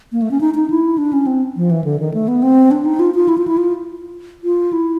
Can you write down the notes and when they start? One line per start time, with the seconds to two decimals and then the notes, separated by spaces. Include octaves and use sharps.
0.12 A#3
0.22 A3
0.31 C#4
0.41 D#4
0.55 D#4
0.70 E4
0.98 D4
1.13 C#4
1.27 C4
1.56 F3
1.71 E3
1.84 D3
2.00 D#3
2.14 A3
2.28 B3
2.43 C4
2.71 D4
2.85 D#4
3.00 F4
3.15 F4
3.28 E4
3.38 F4
3.48 E4
3.57 F4
4.44 F4
4.73 E4